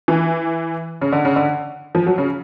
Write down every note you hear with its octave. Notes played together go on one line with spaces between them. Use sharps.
E3
C#3
D3
C#3
D3
F3
F#3
C#3